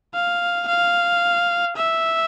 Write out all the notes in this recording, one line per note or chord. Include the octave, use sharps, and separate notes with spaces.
F5
F5
E5